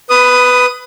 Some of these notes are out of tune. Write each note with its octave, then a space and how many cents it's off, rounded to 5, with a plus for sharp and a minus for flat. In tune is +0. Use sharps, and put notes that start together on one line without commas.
B4 +10 B5 +35 D#6 +0